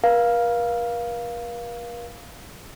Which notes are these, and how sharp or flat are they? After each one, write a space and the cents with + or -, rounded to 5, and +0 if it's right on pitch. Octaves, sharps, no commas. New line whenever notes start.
A#4 +45 F5 +0